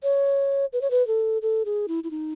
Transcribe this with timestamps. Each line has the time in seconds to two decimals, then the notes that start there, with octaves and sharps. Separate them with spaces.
0.03 C#5
0.73 B4
0.81 C#5
0.91 B4
1.07 A4
1.42 A4
1.65 G#4
1.88 E4
2.04 E4
2.11 D#4